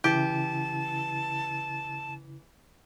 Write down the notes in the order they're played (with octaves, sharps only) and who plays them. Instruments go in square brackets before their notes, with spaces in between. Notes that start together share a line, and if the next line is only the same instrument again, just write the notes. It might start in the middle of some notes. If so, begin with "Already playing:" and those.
[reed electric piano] C#3 E4 [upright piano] E3 [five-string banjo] G4 [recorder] A5